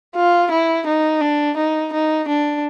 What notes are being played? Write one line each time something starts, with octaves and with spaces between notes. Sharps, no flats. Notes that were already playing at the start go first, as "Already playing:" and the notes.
F4
E4
D#4
D4
D#4
D#4
D4